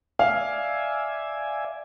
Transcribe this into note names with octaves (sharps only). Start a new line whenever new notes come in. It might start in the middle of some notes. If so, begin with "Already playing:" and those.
D5 E5 F5 G#5